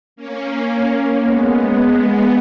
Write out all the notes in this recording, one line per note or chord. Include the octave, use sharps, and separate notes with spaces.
A#3 C#4
G#3 B3